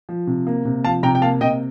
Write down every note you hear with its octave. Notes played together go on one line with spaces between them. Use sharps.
F3
C3
A#3
C3
F3 F5 A5
C3 G5 A#5
G5
A#3 F5 A5
C3 D#5 G5